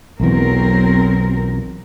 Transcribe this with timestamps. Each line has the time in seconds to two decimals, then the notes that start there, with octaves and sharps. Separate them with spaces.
0.20 B1 E2 E3 F#3 C4 A#4